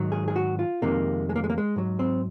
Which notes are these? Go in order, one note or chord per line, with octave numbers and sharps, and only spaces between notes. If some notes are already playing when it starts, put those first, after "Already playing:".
Already playing: G#2 D#3 F#3
G#4
G#4
F#4
F4
F2 C3 D#3 G#3 A#3
G#3
A#3
G#3
A#3
G#3
G#2 F#3
C4